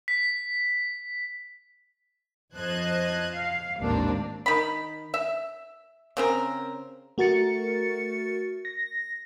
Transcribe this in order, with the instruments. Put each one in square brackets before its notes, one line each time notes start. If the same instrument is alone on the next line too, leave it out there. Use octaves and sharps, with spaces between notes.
[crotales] B6
[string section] F2 C5 D#5 A5 F#6 G#6
F5
A1 D#2 G#2 A#3 C4 D4
[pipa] D#3 B5
E5
C#3 C4 A#4
[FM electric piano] A3 F#4 A#4 A6 C#7
A#6